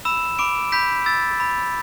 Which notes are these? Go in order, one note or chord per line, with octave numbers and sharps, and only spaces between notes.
B5 E6 E7
B5 D6 D7
B5 G6 B6
E6 A6
B5